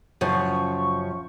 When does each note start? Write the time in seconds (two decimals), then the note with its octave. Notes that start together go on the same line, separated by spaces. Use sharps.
0.21 F#2 C#3 F3 C#6